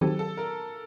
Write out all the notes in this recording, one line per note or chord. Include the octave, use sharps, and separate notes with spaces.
D#3 F#3 C4 G4 A4
A4
A#4